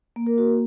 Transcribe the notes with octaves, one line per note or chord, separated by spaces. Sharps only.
A#3
A#4
F#4